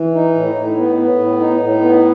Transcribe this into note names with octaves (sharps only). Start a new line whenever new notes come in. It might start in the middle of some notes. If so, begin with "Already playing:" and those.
Already playing: E3
D#4
A2
A2
B3
B3
A2
D#4
A2
B3